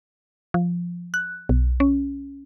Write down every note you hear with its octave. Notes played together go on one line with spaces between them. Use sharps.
F3
F#6
B1
C#4